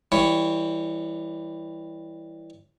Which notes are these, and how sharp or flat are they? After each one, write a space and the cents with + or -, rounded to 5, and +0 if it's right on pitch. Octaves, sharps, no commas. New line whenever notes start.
E3 +0 G3 +15 C#5 +0